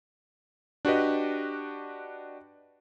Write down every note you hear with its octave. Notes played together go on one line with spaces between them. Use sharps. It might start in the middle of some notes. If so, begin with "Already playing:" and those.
D4 F#4 G4 B4 D#5